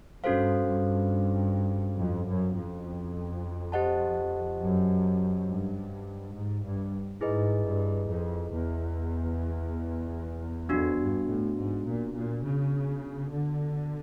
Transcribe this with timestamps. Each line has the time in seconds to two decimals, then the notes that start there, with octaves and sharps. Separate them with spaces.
0.23 G2 C#4 F#4 A4 C5 F5
0.67 G2
1.98 F2
2.26 F#2
2.55 F2
3.72 G4 C5 D#5 F#5 A5
4.60 F#2
5.46 G2
6.34 G#2
6.63 G2
7.20 G#2 E4 G#4 B4 D#5
7.64 G2
8.08 F2
8.52 E2
10.69 F2 B3 D4 F#4
10.99 G2
11.28 A2
11.56 G#2
11.86 A#2
12.14 A#2
12.43 C#3
13.31 D3